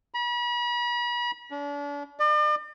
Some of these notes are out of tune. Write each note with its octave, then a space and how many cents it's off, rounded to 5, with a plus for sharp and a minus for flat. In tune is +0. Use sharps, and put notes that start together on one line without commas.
B5 -40
D4 -40
D5 +45